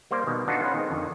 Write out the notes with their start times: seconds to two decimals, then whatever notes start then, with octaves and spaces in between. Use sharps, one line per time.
0.11 G3 A#3 C5 D5
0.26 B2 D#3 G3
0.48 B3 D4 D#4 F4 F#4 A4
0.62 B3 C#4 F4 B4
0.75 D#3 G#3 C4
0.91 F2 D3 D#3